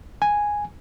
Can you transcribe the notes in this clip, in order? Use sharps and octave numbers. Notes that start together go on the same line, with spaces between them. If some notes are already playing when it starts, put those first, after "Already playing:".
G#5